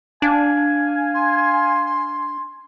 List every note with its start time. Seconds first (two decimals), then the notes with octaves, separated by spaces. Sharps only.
0.22 D4 F5 G#5
1.14 C6